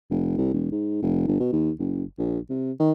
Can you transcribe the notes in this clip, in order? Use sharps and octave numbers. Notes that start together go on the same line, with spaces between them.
F1
C2
E1
G#2
F1
G1
B2
D#2
F#1
A#1
C3
D#3